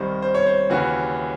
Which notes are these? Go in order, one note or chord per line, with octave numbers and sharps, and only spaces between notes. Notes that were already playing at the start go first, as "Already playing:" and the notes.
Already playing: C2 C3 D#3 C5
C5
C#5
C5
D#2 C#3 E3 F#4